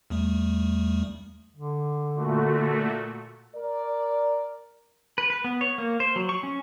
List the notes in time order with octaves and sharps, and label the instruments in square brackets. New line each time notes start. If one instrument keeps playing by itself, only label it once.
[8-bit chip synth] E2 G3 A3
[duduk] D3
[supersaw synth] A#2 A3 F#4
[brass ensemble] A#4 D5
[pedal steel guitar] B4
B4
B3
C#5
A#3
C5
F#3
C#6
C#4